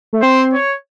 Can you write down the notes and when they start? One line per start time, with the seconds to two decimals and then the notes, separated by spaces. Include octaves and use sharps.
0.13 A3
0.22 C4 C5
0.53 C#5